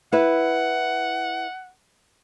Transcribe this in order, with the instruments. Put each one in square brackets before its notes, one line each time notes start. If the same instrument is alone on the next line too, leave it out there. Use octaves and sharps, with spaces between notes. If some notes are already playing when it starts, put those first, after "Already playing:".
[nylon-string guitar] E4 B4 [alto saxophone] F#5